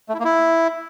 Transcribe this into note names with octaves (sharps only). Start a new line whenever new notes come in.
A3
E4
A#3
E4